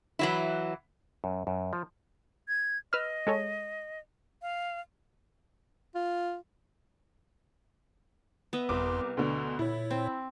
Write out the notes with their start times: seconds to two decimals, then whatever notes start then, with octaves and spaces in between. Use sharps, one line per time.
0.19 E3 F#3 E4
1.24 F#2
1.47 F#2
1.73 F3
2.48 G#6
2.93 B4 D#5 E6 F6
3.27 G#3 A4 C#5
4.42 F5
5.95 F4
8.53 B3 D#5 E5
8.69 G1 C2 F2 C6 D6
9.17 D2 B2 D3 C6
9.59 A#2 E4 C#5
9.91 C4